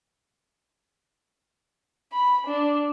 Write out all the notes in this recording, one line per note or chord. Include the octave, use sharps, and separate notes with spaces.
B5
D4